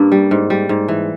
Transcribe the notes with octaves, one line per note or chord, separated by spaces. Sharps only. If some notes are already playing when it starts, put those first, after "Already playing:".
Already playing: G2 A#3 C#4
G3
G#2
G3
G#2
E3